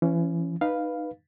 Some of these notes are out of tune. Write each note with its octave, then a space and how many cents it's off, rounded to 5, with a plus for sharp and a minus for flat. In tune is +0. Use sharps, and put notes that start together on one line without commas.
E3 +35 C#4 +0
D#4 -15 B4 -5 F5 +0